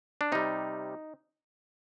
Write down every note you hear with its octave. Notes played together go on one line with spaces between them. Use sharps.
D4
C3 G3 D#4